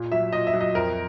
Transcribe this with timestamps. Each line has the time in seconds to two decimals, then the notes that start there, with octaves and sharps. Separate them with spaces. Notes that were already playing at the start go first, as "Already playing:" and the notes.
Already playing: A#2
0.12 F#3 E5
0.33 A#2 D#5
0.47 E5
0.54 F#3
0.61 D#5
0.75 F2 A#4